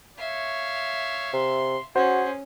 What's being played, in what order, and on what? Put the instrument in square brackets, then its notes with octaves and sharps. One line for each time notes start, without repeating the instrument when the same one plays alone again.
[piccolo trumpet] C#5 [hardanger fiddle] E5 F5
[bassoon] C3 [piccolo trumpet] C6
[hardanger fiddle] C#4 [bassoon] F#4 [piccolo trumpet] G#4 [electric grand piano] C5